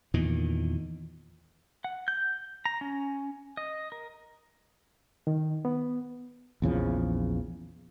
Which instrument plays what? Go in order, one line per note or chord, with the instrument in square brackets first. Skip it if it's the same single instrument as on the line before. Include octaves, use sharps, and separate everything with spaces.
[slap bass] E2 A#2 D#3
[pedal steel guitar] F#5
G6
A#5
C#4
D#5
A#4
[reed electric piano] D#3
B3
[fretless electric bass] A#1 E2 C#3 F3